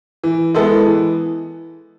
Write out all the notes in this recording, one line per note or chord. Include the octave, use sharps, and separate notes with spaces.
E3
G#3 B3 E4 A4
E3